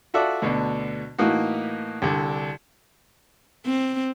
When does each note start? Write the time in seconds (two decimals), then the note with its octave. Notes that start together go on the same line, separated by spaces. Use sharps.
0.14 F4 F#4 A4 D5 E5
0.42 D2 B2 D3
1.18 A2 E3 A#3 D#4 F#4
2.02 C2 D3
3.66 C4